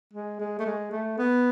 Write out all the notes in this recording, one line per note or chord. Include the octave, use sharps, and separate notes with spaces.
G#3
G#3
A3
G#3
A3
B3